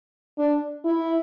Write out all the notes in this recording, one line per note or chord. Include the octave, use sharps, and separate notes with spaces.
D4
E4